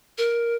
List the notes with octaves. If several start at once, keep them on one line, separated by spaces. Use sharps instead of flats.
A#4